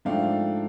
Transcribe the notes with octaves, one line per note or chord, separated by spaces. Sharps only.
G#2 F3 A3 D4 F5 G5